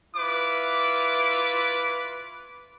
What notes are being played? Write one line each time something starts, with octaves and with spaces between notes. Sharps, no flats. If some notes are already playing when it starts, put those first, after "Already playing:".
E4 F4 B4 D6